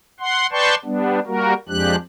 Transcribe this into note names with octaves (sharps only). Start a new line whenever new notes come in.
F#5 C6
B4 D5 G5 A5 C6 C#6
G3 B3 D4
G3 A#3 F#4 A#4
F2 F3 G#3 D4 G4 F#6